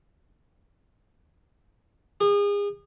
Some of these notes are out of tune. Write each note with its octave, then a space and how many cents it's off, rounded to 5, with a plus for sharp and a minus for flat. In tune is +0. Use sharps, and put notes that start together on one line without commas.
G#4 -35